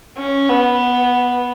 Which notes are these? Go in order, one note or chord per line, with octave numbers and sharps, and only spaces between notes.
C#4
B3